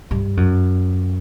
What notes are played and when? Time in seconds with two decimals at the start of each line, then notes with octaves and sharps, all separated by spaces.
0.11 G2
0.37 F#2